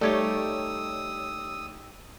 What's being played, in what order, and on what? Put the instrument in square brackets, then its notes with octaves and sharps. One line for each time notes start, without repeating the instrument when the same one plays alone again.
[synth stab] G3 C#5 [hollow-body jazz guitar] A3 [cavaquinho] D#4 G4 A5 [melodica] D#6 E6